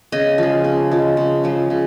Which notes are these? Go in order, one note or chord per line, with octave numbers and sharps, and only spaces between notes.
C#3 D#5
F3 G#3
C#3
F3 G#3
C#3
F3 G#3
C#3